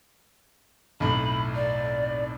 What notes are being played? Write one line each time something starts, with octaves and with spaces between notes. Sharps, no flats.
B1 F2 A2 B5
D5